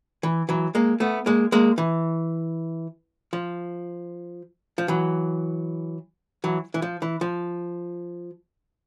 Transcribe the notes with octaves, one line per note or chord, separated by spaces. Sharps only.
E3
E3 F#3
G#3 A#3
A3 B3
G#3 A#3
G#3 A#3
E3
F3
F3
E3 F#3
E3 F#3
E3
F3
E3
F3